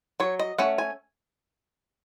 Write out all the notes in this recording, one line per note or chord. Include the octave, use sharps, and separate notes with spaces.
F#3 C#5
D#5
A3 C#4 F#5
G#5